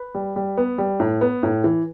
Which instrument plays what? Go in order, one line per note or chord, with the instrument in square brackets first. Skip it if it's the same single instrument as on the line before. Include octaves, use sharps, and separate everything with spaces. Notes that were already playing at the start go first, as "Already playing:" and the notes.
Already playing: [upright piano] B4
G3
G3
B3
G3
A2
B3
A2
E3